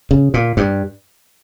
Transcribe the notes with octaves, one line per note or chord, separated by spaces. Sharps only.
C#3
A#2
G2